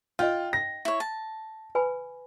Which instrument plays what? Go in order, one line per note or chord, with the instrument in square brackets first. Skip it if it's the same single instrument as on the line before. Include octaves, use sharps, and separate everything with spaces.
[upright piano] F4 [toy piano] D#5 F5 [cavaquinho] G5
[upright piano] A#6
[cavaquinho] E4 C#5
A5
[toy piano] B4 G#5 B5